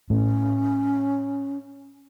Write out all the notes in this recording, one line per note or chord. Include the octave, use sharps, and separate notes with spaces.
A2 C#4